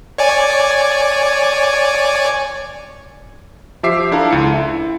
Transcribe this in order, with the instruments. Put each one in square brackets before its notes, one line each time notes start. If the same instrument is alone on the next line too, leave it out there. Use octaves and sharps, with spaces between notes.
[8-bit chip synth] C#5 D5 G#5
[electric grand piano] F3 G4 E5 D6 C7
D4 E4 A4 F5 A#5
C#2 C#7
E4